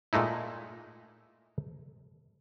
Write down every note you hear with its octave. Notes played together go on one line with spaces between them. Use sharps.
A#2 G#3 A3 D#4 E4